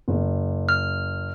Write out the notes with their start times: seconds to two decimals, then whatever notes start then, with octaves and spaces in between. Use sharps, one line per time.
0.08 F#1
0.69 F6